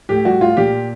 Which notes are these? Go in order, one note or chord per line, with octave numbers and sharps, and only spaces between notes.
A2 G4
G3 F#4
A2 F4
A#2 G4